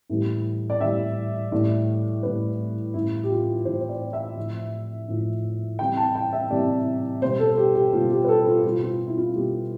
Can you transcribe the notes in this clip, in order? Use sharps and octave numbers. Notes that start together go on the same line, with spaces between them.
A2 E3 G3
D5
A2 E3 G3 E5
A2 E3 G3 D5
A2 E3 G3 B4
A2 E3 G3 E4
G4
F4
A2 E3 G3 C5
C5
D5
E5
A2 F3
A2 F3
C3 E3 G3 G5
A5
G5
E5
C3 E3 G3 D5
B2 G3 C5
A4
G4
G4
B2 G3 F4
G4
B4
A4
F4
B2 G3 F4
F4
E4
F4
B2 G3 G4